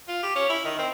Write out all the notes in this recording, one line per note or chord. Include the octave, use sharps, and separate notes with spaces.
F4
G4
C#4
E4
D#3
C4